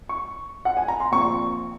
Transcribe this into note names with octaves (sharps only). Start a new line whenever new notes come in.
C#6
F#5
G#5
A#5
C6
A#1 A#2 F3 C4 C#6